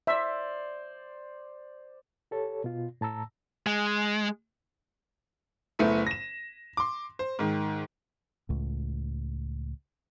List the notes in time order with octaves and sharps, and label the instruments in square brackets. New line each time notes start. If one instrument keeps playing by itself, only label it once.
[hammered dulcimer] C5 D5 [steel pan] E5
[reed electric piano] G4 A4 C#5
B2 F4
A2 A5 A#5 E6
[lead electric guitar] G#3
[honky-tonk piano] F#1 A3 B3 E4 B6 D#7
A#6 E7
C6 D6
C5
G#2 D#3
[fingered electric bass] C#2 A2